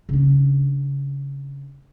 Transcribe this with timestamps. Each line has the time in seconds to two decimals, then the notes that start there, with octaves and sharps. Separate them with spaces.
0.09 C#3 D4